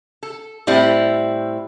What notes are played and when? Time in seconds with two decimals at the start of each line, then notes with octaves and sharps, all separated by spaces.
0.23 A4
0.67 A2 G3 C4 E4